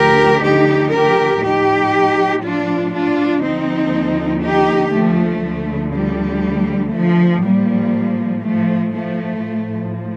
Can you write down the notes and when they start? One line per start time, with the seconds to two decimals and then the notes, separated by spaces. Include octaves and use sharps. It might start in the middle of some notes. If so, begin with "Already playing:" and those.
Already playing: D2 D3 F3 G4 A#4
0.43 D#4 G4
0.94 G4 A#4
1.43 A2 F3 D#4 G4
2.44 D4 F4
2.93 D4 F4
3.44 D#2 D3 F3 C4 D#4
4.43 D#4 G4
4.93 F3 A3
5.44 D2 D3 F3
5.94 G3
6.93 F3 A3
7.43 A2 F3 G3 A#3
8.43 F3 A3
8.93 F3 A3
9.43 A2 F3